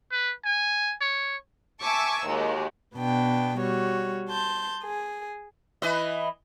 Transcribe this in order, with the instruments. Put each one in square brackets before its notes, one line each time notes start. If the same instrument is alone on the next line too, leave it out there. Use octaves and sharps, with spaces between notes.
[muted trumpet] B4
G#5
C#5
[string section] E5 G#5 A5 C#6 D6 E6
D#2 D#3 G#3 F#4 G4
[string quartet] B2 B3 D4 G5
G3 F#4 C#5
A5 C6 G6
G#4
[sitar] E3 B4 D#5